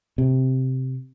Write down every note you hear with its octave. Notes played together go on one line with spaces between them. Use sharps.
C3